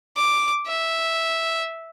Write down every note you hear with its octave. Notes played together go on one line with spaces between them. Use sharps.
D6
E5